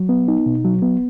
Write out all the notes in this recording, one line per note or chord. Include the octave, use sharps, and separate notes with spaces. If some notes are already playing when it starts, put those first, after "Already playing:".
Already playing: F#3
B3
D#4
B2
F#3
B3